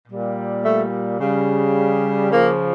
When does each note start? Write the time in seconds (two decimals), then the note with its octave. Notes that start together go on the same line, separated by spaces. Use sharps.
0.08 A#2 G3
0.64 A3
1.20 C#3 G3
2.31 C#3 F3 A#3